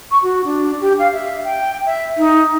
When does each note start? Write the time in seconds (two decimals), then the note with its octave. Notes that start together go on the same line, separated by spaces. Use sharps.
0.11 C#6
0.23 F#4
0.45 D4
0.81 G4
0.99 F5
1.13 E5
1.45 G5
1.86 E5
2.17 D#4